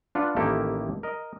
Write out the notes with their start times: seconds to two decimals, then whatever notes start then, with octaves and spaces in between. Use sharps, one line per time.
0.15 D4 F4 B4 F#5
0.36 A1 D#3 A#3 E4 G4 A4
1.03 A#4 D#5